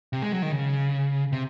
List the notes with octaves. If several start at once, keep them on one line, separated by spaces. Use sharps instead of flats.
C3
G#3
F#3
D#3
C#3
C3